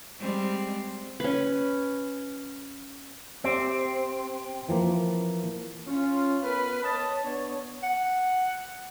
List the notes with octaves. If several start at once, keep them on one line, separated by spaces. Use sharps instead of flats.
G3 G#3 C4
C#4 B4
C4 G4 E5
E3 F3 A#3
C#4 F4
B3 A#4 B4
C#5 D#5 A5
B3 D4 C#5
F#5